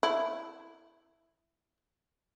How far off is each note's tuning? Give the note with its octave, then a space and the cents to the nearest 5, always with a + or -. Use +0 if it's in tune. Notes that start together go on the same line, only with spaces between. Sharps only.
E4 +5